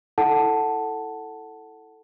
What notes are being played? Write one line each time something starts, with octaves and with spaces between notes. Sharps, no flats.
E4 A4 F#5 A5